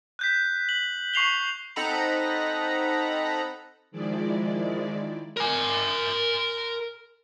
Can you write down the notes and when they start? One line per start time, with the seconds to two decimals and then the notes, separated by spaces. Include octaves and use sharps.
0.19 F#6 G6 B6
0.69 F#7
1.14 C#6 C7 F7 G7
1.76 C4 D#4 A4 F#5 A#5 B5
3.91 D#3 F3 G#3 E4 D5
5.37 A#4 G#5